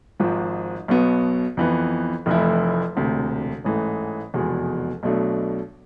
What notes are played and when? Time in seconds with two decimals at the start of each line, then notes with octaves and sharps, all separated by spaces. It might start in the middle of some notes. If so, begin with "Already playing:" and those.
0.20 G#1 G#2 F3
0.88 B1 B2 B3
1.57 F2 E3 B3
2.26 F1 F2 E3 A3 E4
2.96 E1 D2 C3
3.65 A1 G#2 E3 A3
4.34 F1 E2 B2 G#3
5.03 B1 B2 A3 D4